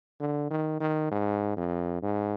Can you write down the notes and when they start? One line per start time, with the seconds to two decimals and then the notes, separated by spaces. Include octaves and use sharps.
0.20 D3
0.51 D#3
0.80 D#3
1.11 G#2
1.57 F2
2.02 G#2